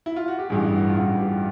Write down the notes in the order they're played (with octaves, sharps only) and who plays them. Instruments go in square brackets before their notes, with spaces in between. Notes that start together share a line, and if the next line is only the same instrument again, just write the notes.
[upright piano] E4
F4
F#4
G4
A1 G2 E3 G#4
F#4
F4
A1 G2 E3 F#4
G4